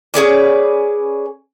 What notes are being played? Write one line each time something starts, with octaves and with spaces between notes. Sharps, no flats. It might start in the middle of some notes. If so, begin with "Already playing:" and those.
C#4 G#4 B4 D5